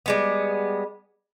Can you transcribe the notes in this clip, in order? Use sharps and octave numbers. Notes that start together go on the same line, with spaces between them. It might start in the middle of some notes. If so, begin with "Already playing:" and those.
G3 G#3 B3